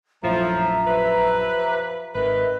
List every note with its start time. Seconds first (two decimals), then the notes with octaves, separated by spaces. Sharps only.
0.23 A#1 F#2 A2 F3 E5 A#5
0.87 F3 G4 B4
2.15 G#1 D#3 B4 E5